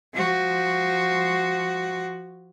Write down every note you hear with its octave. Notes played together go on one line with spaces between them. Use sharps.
F3 F#4